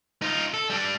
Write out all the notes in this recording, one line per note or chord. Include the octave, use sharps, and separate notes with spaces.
D#4 F4
A4
G3 D4